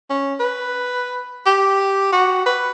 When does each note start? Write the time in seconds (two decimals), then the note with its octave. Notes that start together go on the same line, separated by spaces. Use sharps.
0.10 C#4
0.40 B4
1.46 G4
2.12 F#4
2.46 B4